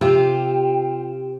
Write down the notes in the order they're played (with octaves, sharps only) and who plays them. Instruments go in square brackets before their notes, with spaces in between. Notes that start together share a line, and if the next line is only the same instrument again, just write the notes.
[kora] C3 [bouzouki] C4 G4 [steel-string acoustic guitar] F4 [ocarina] G5